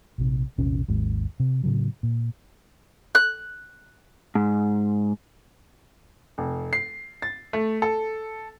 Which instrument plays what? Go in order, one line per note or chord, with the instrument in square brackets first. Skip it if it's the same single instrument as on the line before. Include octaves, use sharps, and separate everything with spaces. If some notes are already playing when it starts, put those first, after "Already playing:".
[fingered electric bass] A#1 C3
A#1 E2 C3 C#4
G#1 D#2 G#2
C3
A2 C#3 F#3
A#2
[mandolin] F#6
[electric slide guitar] G#2
[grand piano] F1
C7
A6
A3
A4